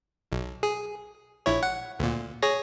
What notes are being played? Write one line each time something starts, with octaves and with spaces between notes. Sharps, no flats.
B1
G#4
A#1 E4 C#5
F#5
D2 A#2
G#4 C#5 A#6